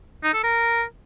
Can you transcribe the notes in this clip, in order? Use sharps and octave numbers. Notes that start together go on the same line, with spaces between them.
D#4
A4
A#4